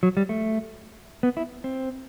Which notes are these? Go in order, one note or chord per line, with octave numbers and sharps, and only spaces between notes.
F#3
G3
A3
B3
E4
C4